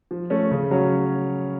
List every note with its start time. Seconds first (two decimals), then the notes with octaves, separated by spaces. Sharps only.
0.11 F3
0.30 A3 C#4
0.51 C#3
0.71 F#3 C#4